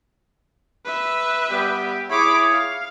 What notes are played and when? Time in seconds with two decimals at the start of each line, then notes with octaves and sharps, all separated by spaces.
0.85 B4 E5
1.50 G3 B3 G4
2.10 E4 G#4 C#5 B5 D6
2.52 F5